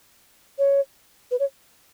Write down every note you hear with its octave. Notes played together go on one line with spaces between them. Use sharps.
C#5
B4
C#5